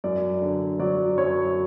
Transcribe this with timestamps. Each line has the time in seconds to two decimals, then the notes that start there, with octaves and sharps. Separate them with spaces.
0.04 F#2 D5
0.42 D3
0.79 F#3 D5
1.17 F#2 C#5